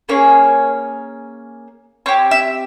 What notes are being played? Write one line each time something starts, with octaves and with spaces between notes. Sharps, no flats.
A#3 C#4 G#4 C#5
C4 G4 C#5
E5